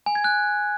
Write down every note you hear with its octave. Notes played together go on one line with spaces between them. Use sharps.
G#5
G#6
F#6